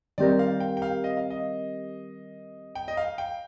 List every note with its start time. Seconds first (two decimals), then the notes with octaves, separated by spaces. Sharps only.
0.18 D#3 G3 C4 G4 A#4 D5
0.39 F5
0.60 G5
0.77 G5
0.82 F5
1.04 D#5
1.17 F5
1.30 D#5
2.75 G5
2.88 D#5
2.97 F5
3.18 G5